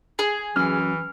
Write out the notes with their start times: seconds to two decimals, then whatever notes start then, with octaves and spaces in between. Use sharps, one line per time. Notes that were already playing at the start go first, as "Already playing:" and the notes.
0.19 G#4
0.56 F#2 E3 F6